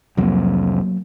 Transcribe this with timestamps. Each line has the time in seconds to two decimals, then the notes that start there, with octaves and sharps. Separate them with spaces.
0.17 C2 F2 F#3 A#3